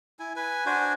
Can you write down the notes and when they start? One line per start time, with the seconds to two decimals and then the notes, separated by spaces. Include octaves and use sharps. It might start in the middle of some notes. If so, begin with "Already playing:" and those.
0.19 E4 G#5
0.36 B4 G#5
0.66 D4 F#4 C5 G#5